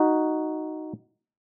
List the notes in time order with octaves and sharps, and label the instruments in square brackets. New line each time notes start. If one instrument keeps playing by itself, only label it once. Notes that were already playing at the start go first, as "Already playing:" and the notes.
Already playing: [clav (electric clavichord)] D#4 F#4